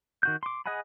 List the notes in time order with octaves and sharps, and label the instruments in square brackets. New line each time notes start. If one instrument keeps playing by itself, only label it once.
[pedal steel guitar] D#3 F#4 G6
C6 D6
G#4 D#5 F#5 G#5 B5